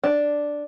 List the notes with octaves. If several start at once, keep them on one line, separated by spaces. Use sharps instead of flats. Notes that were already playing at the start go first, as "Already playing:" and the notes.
D4